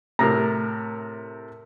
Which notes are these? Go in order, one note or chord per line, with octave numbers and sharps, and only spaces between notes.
A2 C3 A#4 A#5